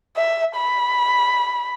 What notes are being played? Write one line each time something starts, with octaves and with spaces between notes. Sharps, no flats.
E5
B5